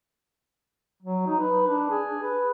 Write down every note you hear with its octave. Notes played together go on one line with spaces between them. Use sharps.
F#3
D#4
B4
D4
G#4
B4